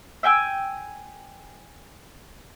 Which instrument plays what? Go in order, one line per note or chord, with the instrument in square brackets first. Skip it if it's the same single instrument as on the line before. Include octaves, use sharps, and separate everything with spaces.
[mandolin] E5 G5 G#5 E6